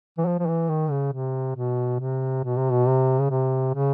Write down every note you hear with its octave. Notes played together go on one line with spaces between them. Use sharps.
E3
F3
F3
E3
D#3
C#3
C3
B2
C3
B2
C3
B2
C3
C#3
C3
C#3